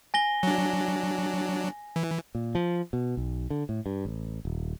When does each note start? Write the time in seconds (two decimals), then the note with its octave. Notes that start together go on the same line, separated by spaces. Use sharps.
0.14 G#5 A#6 G7
0.43 F#3 D4
1.96 E3
2.35 A#2
2.55 F3
2.93 B2
3.17 B1
3.50 D3
3.69 A2
3.86 G2
4.05 A1
4.45 D#1